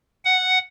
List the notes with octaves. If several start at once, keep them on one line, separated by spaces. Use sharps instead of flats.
F#5